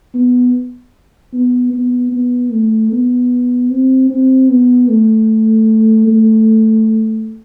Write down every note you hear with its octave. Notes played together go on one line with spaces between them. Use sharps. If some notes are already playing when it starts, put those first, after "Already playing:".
B3
B3
B3
B3
A3
B3
C4
C4
B3
A3
A3